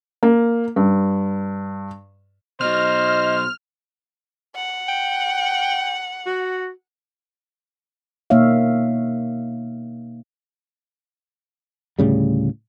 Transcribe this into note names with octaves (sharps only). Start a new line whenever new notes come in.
A#3
G2
B2 F#3 C5 D#5 F6
F#5
G5
F#4
B2 A#3 D#4 C#5 E5 F5
D2 A2 C#3 G3